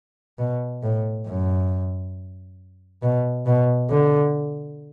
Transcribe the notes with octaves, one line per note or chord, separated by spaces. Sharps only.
B2
A2
F#2
B2
B2
D3